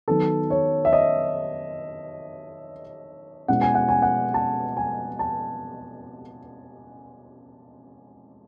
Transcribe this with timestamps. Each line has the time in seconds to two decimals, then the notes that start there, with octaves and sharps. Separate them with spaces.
0.08 D#3 F#3 B3 D#4 A4
0.50 C#5
0.85 E5
0.93 D#5
3.48 B2 G#3 C#4 E4 F#5
3.62 G#5
3.75 F#5
3.88 G#5
4.02 F#5
4.34 A5
4.77 G#5
5.19 A5